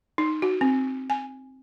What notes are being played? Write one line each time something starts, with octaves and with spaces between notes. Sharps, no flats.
D#4
F#4
C4
G#5